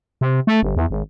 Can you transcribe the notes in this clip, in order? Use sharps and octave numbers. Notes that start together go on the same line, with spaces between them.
C3
A3
G1
E2
G#1